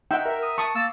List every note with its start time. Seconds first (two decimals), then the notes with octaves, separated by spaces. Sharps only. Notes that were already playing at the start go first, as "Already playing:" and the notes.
0.11 D#4 E5 F#5 G5
0.25 A#4 E5
0.43 D#6
0.58 A5 C#6 D#6
0.75 A#3 E6 A6